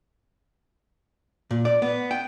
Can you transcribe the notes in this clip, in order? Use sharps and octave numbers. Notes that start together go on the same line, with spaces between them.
A#2
D5
B3
G5